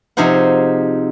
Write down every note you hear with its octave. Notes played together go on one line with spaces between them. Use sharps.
C3 F3 D#4 G#4 C5 F#5